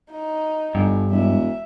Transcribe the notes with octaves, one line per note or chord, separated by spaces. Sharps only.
D#4
G1 G2
E1 E5